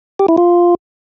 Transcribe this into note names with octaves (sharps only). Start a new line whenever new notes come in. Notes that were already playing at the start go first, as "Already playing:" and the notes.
G4
E4
F4